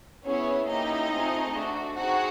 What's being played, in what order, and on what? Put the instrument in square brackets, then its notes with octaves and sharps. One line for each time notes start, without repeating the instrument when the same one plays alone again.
[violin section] B3 C#4 E4 G#4 C#5
A#3 C#4 D#4 E4 G4 D#5
A3 C4 F4 G#4
A3 D4 F#4
C4 D#4 F#4 G#4 F#5